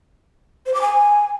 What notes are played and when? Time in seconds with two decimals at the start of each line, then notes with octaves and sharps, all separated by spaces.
0.66 C5
0.74 D6
0.81 G#5